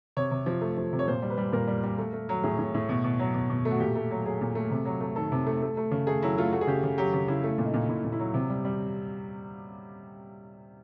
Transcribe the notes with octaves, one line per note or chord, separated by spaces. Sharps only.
C3 C#5
C3
F3
A3
F3
C3
C#5
A#2 C5
G3
B4
G3
A#2 A#4
G3
G3
A3
A3
F#3
A2 G#4
A2
A2
B2
B2
F#3
B2
B2
A3
F#4
A#2 G4
A3
F#3
F#3 G#4
A#2
A3
C3
F#3
A3
D#3 A4
C3
A3
A3
A3
C#3
A3 G#4
F#3 E4
A3 F4
A3 F#4
G#4
C#3 G4
C#3
F#3 G4
C#3 G4
C#3 E4
A3 E4
A#2
D#4
A#2
A#2 E4
A#2
E4
F#3
C3
G3
G3